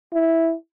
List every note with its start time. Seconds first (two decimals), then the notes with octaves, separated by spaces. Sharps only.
0.13 E4